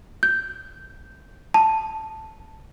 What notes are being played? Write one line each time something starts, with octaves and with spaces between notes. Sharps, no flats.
G6
A5